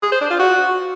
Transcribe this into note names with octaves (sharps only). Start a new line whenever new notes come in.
G#4
C5
D4
F4
F#4